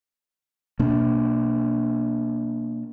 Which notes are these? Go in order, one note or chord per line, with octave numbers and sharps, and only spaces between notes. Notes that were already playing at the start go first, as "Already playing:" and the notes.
B2 A#3 D4